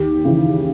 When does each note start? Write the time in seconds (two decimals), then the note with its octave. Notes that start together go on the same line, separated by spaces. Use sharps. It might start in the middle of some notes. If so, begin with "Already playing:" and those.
Already playing: D#2 G4
0.25 C#3 E3